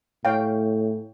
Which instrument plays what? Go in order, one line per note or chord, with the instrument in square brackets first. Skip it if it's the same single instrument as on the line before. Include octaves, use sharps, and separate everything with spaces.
[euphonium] A2 [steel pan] C#5 F5 G5